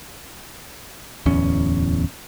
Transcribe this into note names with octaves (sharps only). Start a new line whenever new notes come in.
D1 E2 C#4